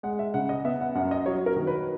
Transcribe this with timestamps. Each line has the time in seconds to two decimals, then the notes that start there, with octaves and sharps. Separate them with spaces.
0.03 G#3 F#5
0.19 E5
0.34 C#3 F#5
0.49 D#5
0.65 B3 E5
0.80 F#5
0.95 F#2 F#5
1.11 D#5
1.26 F#3 C#5
1.46 A#4
1.56 D#3
1.67 B4